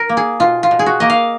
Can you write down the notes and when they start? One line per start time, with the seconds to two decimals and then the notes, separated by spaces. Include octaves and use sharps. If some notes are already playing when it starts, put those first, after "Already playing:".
Already playing: A#4
0.09 A#3
0.17 G#4
0.40 B2 F4
0.63 F4
0.71 B2
0.79 G#4
0.86 F#4
1.00 A#3 D#5
1.10 F5